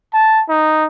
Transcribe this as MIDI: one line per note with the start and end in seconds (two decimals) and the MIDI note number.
0.14 0.43 81
0.49 0.86 63